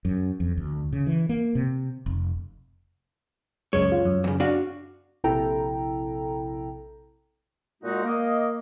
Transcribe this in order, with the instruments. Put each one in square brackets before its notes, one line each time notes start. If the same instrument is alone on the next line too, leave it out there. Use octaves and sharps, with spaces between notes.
[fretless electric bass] F#2
F2
D2
C#3
E3
A#3
C3
F1
[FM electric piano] C#2 F#2 G#3 [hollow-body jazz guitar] C#5
[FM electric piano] F4
F#2
[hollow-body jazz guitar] E2 C#3
D4 F#4 F5
[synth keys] A#1 C3 E4 A4 G5 A#5
[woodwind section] A#2 G#3 A#3 D#4 F#4
A#3 D#5